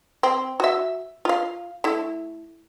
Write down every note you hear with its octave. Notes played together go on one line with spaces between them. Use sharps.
C4
F#4 E5
F4 F5
A3 E4